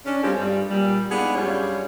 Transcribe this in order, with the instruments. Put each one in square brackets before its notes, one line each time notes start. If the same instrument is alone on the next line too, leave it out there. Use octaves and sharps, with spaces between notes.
[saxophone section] C#4 D4
G3 G#3 C4 F4 G4 A4
G2 G3
A#2 G3
G#3 B3 D4 D#4 F4 G#4
F#2 G3 D4 F4 G#4 C#5